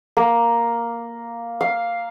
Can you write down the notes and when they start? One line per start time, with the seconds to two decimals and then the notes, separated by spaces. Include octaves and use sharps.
0.17 A#3
1.61 F5